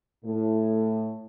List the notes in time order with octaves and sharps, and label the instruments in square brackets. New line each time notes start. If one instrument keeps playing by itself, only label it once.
[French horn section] A2